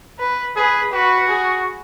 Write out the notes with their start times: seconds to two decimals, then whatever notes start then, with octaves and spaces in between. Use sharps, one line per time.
0.20 B4
0.56 G#4 B4
0.93 F#4 B4
1.28 G#4